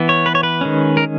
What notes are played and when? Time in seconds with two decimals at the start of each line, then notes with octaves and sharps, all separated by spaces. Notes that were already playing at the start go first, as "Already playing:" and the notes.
Already playing: E3 B3
0.09 C#5
0.26 B4
0.35 C#5
0.43 B4
0.61 D#3 G#3 C#4
0.97 A#4